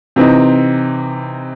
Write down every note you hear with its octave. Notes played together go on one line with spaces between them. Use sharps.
C3 E3 C4 D#4